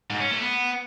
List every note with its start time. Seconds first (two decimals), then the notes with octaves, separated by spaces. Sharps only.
0.10 G#2
0.20 C#4
0.31 A3
0.41 B3